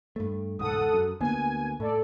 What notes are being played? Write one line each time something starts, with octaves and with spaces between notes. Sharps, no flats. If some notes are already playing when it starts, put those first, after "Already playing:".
G2 A3
E1 C#2 G#2 A4 F#5 D#6
F#2
D2 A#3 B3 G#5
A2 A4 D5